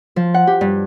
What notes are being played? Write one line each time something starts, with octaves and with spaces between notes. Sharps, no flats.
F3
F#5
G4
G2